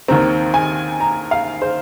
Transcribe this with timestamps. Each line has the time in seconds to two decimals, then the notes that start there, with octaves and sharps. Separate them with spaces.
0.08 D#2 D#3 C4 A#5
0.54 G#5
1.00 A#5
1.31 F5
1.62 C5